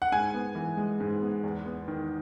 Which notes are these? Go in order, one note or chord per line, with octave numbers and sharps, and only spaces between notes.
F#5
G#2 G#5
B3
E3
G#3
G#2
B3
E2
B3
D#3